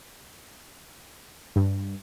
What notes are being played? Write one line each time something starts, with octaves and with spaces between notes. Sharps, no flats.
G2